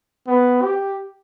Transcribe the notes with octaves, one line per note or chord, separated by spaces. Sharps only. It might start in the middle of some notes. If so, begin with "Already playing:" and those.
B3
G4